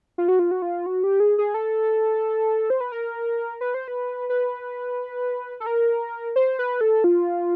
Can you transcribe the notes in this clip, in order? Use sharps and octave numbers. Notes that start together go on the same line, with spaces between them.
F4
F#4
F4
F#4
F4
F#4
G4
G#4
G#4
A4
C5
B4
A#4
B4
C5
B4
B4
A4
A#4
C5
B4
A4
F4